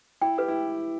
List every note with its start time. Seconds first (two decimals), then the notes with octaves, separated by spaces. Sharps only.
0.21 E4 G5
0.38 G4 B4
0.48 E4